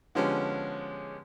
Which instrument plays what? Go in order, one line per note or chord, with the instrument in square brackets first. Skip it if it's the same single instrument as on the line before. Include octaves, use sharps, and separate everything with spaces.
[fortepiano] D3 F3 G#3 B3 C#4 G4